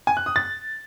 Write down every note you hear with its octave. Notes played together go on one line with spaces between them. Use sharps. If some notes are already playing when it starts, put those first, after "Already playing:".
G#5
F#6
D#6
A6